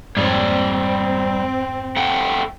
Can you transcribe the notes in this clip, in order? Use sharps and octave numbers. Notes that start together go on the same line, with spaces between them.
F2 G#2 G3 C4 C#5 D5
A3 F#5 G5